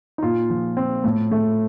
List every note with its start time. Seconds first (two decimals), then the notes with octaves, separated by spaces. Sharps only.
0.18 D#4
0.22 A#2 F4
0.50 F3
0.77 C4
1.04 A2
1.31 A3